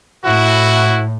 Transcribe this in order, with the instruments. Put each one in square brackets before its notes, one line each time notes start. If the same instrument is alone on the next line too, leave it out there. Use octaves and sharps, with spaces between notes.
[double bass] A2 [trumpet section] E4 F#4